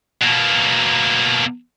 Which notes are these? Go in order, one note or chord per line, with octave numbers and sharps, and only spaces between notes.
B2 A#3